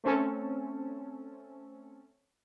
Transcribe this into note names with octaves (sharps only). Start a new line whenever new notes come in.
A3 C4 C#4 A4